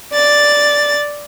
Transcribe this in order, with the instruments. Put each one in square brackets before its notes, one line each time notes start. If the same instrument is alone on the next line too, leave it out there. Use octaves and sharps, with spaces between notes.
[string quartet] D5 A6